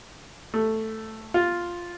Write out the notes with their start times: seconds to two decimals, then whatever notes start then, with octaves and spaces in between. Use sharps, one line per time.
0.54 A3
1.34 F4